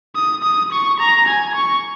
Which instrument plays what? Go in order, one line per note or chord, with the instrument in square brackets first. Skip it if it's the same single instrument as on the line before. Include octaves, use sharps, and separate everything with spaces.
[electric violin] D#6
D#6
C#6
A#5
G#5
C#6